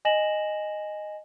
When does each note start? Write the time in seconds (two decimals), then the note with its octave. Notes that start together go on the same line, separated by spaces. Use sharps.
0.05 D#5 G#5 A#6 E7 F#7